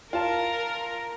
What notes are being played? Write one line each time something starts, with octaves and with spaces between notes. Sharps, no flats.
F4 A#4 A5